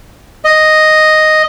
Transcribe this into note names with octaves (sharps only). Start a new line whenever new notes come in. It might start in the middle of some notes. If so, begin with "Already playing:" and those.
D#5